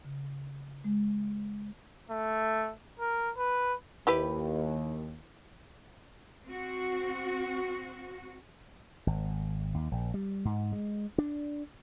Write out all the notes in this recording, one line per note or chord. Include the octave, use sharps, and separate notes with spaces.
C#3
G#3
A3
A#4
B4
D#2 E4 G4 B4
C4 F#4
G#1
D#2
A#1
G3
G#2
G#3
D4